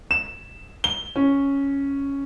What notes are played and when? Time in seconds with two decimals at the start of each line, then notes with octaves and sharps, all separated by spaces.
0.11 E7
0.84 G7
1.16 C#4